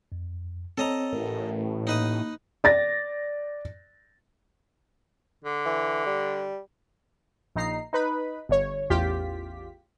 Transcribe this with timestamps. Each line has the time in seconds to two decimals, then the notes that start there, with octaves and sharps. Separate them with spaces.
0.12 F2
0.78 C4 A4 C#5 D#5 A#5 E6
1.13 A1 A2 A#4
1.87 A#3 D#4 B4 D#6
2.64 D5 A6 A#6
5.45 D3
5.66 E3
6.06 G3
7.56 A#1 D#4 A#5 C7
7.93 D#4 B4 B5
8.49 G1 C#5
8.90 A1 E2 F4 G4 B6